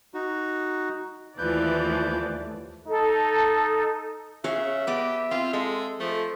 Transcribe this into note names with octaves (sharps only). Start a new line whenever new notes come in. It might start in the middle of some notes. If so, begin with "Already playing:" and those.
D#4 F#4
D#2 E3 F3 A3 B4 D5 G6
D#4 A4
C#3 G#4 C#5 E5 F5
B3 G4 D5 D#5
C4 F4 F5
G#3 A4
F3 A3